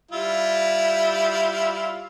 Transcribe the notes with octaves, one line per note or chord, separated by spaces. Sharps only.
G3 E4 F4